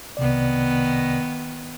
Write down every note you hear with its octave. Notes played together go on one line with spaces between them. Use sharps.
C2 C3 D#3 B3 D5